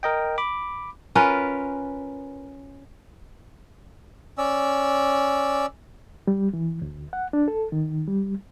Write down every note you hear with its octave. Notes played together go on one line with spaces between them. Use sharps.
A#4 D#5 G5
B5 D6
C#4 F4 A#4 B4
C#4 D5 E6
G3
E3
D2
F#5
D4
A4
D#3
G3